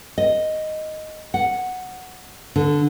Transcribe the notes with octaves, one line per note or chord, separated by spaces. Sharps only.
D#5
F#5
D3